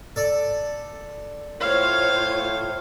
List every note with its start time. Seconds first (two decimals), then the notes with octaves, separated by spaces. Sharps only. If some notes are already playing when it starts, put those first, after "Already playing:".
0.16 A4 D5
1.61 A2 F4 C5 C#5 F5